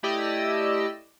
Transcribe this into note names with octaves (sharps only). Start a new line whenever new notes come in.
A3 E4 G4 D5 D#5 E6